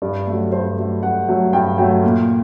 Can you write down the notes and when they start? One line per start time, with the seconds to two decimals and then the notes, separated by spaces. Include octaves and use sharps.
0.02 G2 D5
0.27 F#3 A3
0.52 G2 C5
0.77 F#3 A3
1.03 G2 F#5
1.28 F#3 A3
1.53 G2 G5
1.78 F#3 A3 G5
2.03 A#2